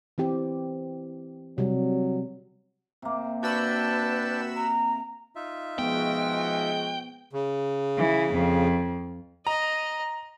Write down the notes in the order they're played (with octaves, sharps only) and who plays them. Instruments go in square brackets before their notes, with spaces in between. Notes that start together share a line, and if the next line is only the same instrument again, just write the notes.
[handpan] E3 C4 G4
[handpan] C3 G3 [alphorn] F#3
[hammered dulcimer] C3 A#3
[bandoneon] D4 G5 A5 [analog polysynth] F#4 B5 E6 [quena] B4
[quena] A#5
[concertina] D#4 F4 E5
[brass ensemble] F3 G#3 F#4 [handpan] B3 [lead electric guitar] G5
[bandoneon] C#3
[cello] E3
F2
[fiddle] D#5 [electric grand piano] A#5